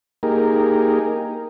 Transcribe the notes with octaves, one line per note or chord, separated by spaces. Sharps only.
A#3 D#4 G4 G#4 A#4